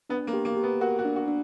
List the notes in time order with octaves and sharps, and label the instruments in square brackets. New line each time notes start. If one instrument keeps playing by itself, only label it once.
[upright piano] B3 [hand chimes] D4
[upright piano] A#3
[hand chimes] G4
[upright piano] A#3
[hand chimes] G4
[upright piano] B3
[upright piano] F#4 [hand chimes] A#4
[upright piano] F#4
[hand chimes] D4
[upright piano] F#4
[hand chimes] D4